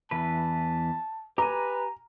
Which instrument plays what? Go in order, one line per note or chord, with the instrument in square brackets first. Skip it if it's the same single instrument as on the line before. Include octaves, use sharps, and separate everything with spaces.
[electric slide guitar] E2 E3 B4 [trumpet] A5
[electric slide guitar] G4 G#5 [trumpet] B4 [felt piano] A#5